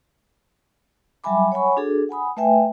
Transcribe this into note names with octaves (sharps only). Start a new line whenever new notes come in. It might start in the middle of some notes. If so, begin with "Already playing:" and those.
F#3 G3 E5 G#5 B5 D6
C#5 F#5 G#5 B5 C#6
D4 F#4 G#4 A4
F#5 G#5 B5 D#6
A3 B4 E5 G5 G#5